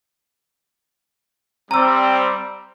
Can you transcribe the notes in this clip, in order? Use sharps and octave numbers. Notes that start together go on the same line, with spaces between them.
G3 C4 A#5 E6